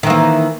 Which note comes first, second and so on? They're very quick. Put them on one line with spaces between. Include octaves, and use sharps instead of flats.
D#3 E3 A#3